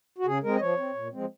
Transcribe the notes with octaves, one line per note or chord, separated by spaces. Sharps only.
F#4
C#3 G#4
G#3 C4 A#4
D#5
F3 C#5
C4
A#2
F3 G#3 C4